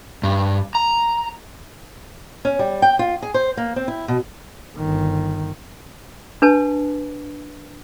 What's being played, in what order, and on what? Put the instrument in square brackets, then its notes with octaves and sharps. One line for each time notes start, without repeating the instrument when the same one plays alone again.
[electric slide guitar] G2
A#5
[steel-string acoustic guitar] C#4
G3
G5
F4
G#4
C5
A#3
C4
E4
B2
[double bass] G1 D#3
[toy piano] D4 B4 A5